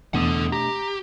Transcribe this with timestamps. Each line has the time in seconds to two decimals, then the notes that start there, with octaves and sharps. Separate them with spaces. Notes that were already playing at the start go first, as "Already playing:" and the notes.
0.14 E2 B2 A3 D4 A4 F#5 D#6
0.52 G4 A#5